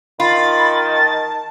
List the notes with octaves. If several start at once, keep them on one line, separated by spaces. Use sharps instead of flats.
D#3 F4 B5 A6
A5